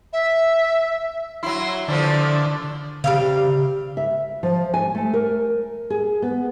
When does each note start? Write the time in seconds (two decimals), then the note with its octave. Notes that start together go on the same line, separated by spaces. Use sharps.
0.13 E5
1.43 F#3 E4 C6
1.88 D3 E3 F3 A3
3.04 C#3 G3 C4 F5
3.97 E5
4.43 F3
4.74 G#5
4.95 A3
5.14 A#4
5.90 G#4
6.22 B3